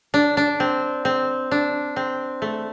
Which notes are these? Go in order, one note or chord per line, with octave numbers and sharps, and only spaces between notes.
D4
D4
C4
C4
D4
C4
A3